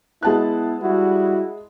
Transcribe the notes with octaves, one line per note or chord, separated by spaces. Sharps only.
G#3 B3 E4 A5 F#6
G3 E4 F#4